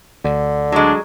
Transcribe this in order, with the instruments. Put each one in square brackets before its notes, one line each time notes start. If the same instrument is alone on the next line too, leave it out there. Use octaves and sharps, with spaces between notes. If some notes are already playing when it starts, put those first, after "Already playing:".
[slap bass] D2 [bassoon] D3
[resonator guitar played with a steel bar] F#3 G#3 [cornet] D4